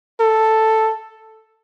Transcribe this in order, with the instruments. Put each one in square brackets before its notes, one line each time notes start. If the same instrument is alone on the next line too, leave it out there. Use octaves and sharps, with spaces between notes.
[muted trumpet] A4